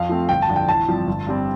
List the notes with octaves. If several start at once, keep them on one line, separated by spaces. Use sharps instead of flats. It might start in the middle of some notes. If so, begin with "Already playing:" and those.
Already playing: F2 F5
F3 A3 C4
G1 G5
A5
F2 D3
G5
A1 A5
G2 F3 C4
G1
G2 G3 C4